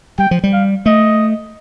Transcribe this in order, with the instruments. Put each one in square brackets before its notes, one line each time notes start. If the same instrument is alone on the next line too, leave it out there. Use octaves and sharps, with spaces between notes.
[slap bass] G3 [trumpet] G5
[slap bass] F3
G3
[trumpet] F5
[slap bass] A3 [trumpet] D#5